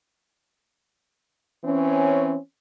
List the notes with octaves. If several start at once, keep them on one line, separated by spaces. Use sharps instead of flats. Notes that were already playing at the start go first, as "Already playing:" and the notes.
E3 C4 C#4